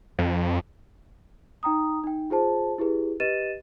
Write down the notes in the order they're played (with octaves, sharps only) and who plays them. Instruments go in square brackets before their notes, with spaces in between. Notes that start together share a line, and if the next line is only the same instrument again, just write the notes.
[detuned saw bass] F2
[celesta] D#4 G5 A#5 D#6
D#4 G5
F4 G#4 C5 A5
E4 G4 G#4 B4
G4 B4 D#5 A6 D#7 E7